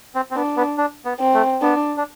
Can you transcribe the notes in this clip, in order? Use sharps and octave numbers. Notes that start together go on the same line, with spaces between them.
C4
C4
B3 D4
B3
D4
B3
C4
A3
B3 D4
D4